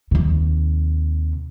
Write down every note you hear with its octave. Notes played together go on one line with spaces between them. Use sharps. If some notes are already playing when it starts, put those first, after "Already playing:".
D#2 C3